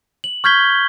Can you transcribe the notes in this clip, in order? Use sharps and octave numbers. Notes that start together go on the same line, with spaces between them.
F#7
C#6 F6 G6 G#6 B6 G7